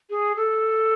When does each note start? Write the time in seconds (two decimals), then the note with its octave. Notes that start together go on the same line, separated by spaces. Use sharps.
0.10 G#4
0.36 A4